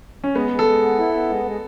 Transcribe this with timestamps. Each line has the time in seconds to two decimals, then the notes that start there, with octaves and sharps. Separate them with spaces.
0.24 C#4
0.35 G#3 B3
0.51 G#3
0.59 A4
0.67 G#3
0.83 B3
0.98 E4
1.14 B3
1.30 G#3
1.45 G#3